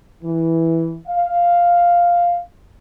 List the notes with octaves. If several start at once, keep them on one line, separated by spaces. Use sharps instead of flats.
E3
F5